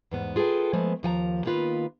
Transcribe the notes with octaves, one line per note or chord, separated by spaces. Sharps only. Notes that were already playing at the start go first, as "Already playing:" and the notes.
E2 G#2 B3
F4 G#4 A4 B4 G5
F3 G#3 A3 B3
D#2 F3 G#5 A#5
D#3 A#3 B3 F4 B4